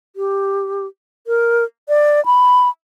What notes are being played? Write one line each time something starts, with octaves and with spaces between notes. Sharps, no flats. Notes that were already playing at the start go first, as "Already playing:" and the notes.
G4
A#4
D5
B5